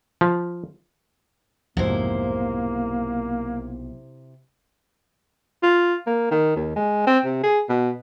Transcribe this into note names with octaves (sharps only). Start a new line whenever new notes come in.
F3
B1 F2 G#2 C3 A#3 E4 C5
F4
A#3
D#3
D#2
G#3
C4
C3
G#4
B2